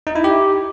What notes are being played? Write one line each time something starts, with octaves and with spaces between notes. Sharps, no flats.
D#4
E4
G4